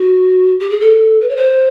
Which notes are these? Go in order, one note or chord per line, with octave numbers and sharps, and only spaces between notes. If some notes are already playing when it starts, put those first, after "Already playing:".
Already playing: F#4
G4
G#4
A4
B4
C#5
C5